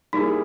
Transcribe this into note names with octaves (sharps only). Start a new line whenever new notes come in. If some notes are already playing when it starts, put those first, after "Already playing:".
G3 A#3 D#4 E4 G#4